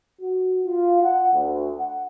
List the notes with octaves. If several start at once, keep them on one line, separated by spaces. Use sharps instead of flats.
F#4
F4
F#5
D2
F#5